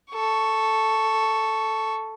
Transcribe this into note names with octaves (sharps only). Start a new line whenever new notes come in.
A4 C#6